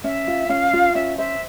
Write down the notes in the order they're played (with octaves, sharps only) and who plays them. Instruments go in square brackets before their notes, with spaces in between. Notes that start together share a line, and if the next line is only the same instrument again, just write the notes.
[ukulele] C#4 [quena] E5
[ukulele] F4
[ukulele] C#4 [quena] F5
[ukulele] F4
[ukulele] C#4 [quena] E5
[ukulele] C5 [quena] E5